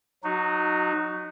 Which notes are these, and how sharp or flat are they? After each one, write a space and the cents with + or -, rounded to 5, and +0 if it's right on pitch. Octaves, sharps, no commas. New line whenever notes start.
F#3 -25 D#4 -15 F#4 +5